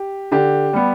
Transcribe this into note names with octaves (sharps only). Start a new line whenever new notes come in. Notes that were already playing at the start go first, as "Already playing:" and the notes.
Already playing: G4
D3 G4
G3 B3